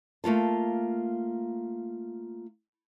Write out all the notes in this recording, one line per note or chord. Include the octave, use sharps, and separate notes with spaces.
A3 A#3 F4 A5